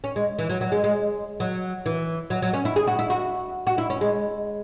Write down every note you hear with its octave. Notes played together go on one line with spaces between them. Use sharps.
C#4
G#3
E3
F#3
F#3
G#3
G#3
F#3
E3
F#3
F#3
C#4
E4
G#4
F#4
E4
F#4
F#4
E4
C#4
G#3